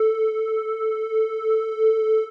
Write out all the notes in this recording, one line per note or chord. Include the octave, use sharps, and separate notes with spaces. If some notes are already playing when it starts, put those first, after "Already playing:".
Already playing: A4